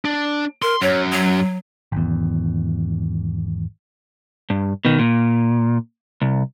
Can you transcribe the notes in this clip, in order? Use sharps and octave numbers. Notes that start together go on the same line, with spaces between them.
D4
A#4 C6
F#2 C#5
F#3
G#1 E2
G2
B2 D#3
A#2
C2